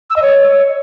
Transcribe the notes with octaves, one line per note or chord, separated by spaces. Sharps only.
E6
D#5
C#5